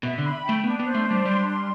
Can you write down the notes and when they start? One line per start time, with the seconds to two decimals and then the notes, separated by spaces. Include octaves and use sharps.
0.03 B2 E5
0.18 D3
0.23 B5
0.43 G5
0.49 A3
0.64 B3 D4
0.80 B3
0.85 C5
0.95 A3
1.06 D4
1.11 G3
1.25 G3 C6
1.46 C6